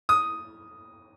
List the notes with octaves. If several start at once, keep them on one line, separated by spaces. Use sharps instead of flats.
D#6